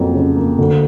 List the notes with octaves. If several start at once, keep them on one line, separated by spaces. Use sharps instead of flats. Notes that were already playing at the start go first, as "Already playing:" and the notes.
Already playing: F2 F#3 A#3
C#3
A#3
D2